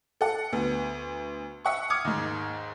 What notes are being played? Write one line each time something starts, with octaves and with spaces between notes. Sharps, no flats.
A4 F#5
D2 B3
E5 F#5 C#6
D6 D#6 F6 G#6 C#7
D#2 G#2